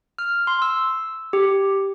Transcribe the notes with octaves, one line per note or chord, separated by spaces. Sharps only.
F6
C6
E6
G4